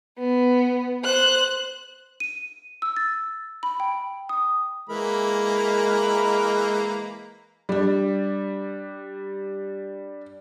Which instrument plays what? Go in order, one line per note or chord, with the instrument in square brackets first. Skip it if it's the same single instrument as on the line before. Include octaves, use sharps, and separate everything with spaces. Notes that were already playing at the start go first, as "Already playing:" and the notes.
[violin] B3
C5 F#6
[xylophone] D#7
E6
A6
B5
G5
D#6
[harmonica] E3 A#3 B5 [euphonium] G#3 [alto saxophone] A#4
[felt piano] G3 D4